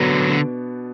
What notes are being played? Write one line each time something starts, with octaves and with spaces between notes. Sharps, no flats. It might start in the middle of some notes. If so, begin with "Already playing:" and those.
Already playing: B2 D3 F#3 B3 D4
D3